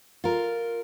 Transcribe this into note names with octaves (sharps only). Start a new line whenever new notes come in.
F4 A#4